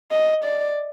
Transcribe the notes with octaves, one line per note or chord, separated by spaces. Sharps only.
D#5
D5